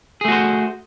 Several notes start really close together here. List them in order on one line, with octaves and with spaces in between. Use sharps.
G#4 A3 F#4 C5